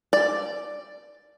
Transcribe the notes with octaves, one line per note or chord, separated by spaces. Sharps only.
D5